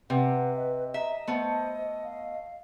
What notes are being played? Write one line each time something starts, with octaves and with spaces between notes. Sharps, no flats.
C3 B4 F#5
D#5
D#5 E5 A#5
A3 B3 C5
F5